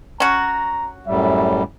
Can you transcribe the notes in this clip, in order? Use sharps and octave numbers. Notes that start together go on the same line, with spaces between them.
C#4 F#4 A#5
F#2 A2 G3 E5